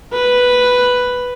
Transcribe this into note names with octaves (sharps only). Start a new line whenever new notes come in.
B4